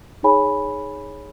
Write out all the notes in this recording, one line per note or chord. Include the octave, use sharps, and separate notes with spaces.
D#4 G#4 C#5 G#5 B5